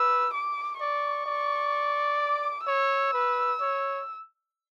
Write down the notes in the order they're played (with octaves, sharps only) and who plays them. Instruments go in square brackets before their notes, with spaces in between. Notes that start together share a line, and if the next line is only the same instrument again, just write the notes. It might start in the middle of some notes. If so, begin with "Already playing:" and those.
Already playing: [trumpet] B4 [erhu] E6
[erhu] D6
[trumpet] D5 [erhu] C#6
[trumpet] D5
[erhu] D6
[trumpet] C#5 [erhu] E6
[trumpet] B4
C#5